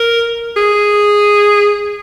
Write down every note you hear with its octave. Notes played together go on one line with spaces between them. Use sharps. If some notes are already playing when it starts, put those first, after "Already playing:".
Already playing: A#4
G#4